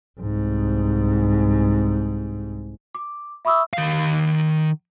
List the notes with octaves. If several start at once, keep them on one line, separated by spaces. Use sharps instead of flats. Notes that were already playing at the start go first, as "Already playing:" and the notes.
C2 G#2
D6
E5 B5 C#6 D#6 E6
D#3 F5